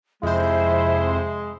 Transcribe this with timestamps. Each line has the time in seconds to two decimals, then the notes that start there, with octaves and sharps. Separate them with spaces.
0.23 F2 C3 G#3 E4 C5 E5